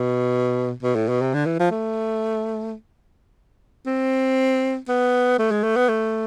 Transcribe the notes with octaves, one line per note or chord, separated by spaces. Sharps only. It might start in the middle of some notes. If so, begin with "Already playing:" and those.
Already playing: B2
B2
A2
B2
C3
D3
E3
F3
A3
C4
B3
A3
G#3
A3
B3
A3